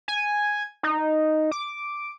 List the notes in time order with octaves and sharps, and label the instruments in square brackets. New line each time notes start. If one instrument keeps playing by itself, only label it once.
[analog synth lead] G#5
D#4
D6